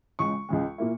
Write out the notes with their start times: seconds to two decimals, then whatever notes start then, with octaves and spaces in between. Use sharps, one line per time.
0.19 C#2 C#3 G#3 C#6
0.49 C#2 C#3 G#3
0.78 A#2 A#3 E4